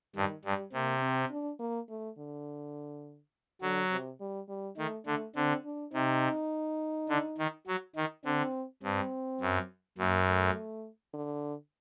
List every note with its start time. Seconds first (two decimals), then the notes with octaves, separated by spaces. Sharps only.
0.15 G2 D#3
0.43 G2 G3
0.73 C3 A#3
1.02 C4
1.30 D4
1.59 A#3
1.89 A3
2.18 D3
3.62 D3 F#3
3.91 C3
4.20 G3
4.49 G3
4.78 D#3 A3
5.06 D3 A3
5.36 D3 C4
5.65 D4
5.93 C3 D#4
7.09 D3
7.38 D#3
7.67 F#3
7.96 D#3
8.24 D3 C4
8.83 G2 C4
9.41 F#2
9.98 F#2 A#3
10.27 A3
11.13 D3